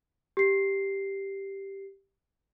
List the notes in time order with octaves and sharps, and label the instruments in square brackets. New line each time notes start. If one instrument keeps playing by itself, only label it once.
[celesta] G4 C7